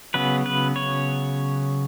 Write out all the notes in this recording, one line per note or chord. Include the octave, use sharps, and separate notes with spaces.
C#3 F#3 B3 B4
B4
C#5